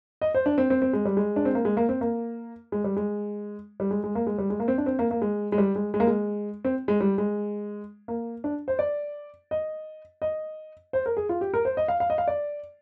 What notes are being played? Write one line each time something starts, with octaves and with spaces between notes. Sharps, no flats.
D#5
C5
D4
C4
C4
C4
G#3
G3
G#3
D4
C4
A#3
G#3
A#3
C4
A#3
G#3
G3
G#3
G3
G#3
G#3
A#3
G#3
G3
G#3
A#3
C4
D4
C4
A#3
A#3
G#3
G#3
G3
G#3
G#3
A#3
G#3
C4
G#3
G3
G#3
A#3
D4
C5
D5
D#5
D#5
C5
A#4
G#4
F4
G4
A#4
C5
D#5
F5
F5
D#5
F5
D5